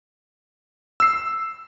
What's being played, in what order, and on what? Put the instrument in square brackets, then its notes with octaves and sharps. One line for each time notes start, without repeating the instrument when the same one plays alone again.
[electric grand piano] E6 C7